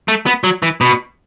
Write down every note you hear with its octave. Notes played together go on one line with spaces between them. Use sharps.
A3
B3
F#3
E3
B2